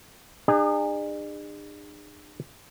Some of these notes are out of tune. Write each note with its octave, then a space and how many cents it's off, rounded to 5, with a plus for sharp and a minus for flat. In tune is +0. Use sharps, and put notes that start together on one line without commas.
D4 +45 G#4 -35